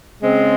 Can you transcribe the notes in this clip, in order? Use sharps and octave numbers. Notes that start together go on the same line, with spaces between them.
C#3 G#3 C4